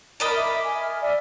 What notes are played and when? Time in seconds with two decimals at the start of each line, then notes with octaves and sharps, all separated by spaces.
0.20 A#4 D5 D#5 B5
0.35 E5 D6
0.62 G#5
0.81 F6
1.01 D5 E5 G#5